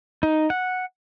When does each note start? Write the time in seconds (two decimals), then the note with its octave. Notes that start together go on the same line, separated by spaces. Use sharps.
0.23 D#4
0.50 F#5